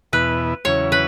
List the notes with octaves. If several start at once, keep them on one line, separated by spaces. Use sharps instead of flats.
E2 B2 B3 E4 B4
E2 C#3 F#3 C#4 E4 C#5
B4